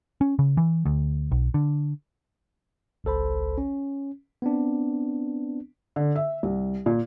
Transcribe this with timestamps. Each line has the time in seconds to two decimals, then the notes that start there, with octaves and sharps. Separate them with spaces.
0.21 C#4
0.39 C#3
0.57 E3
0.86 D2
1.31 B1
1.54 D3
3.04 G#1 C#2 A4 C5 B5
3.58 C#4
4.42 B3 C4 D4
5.96 D3
6.16 E5
6.43 C2
6.86 A#2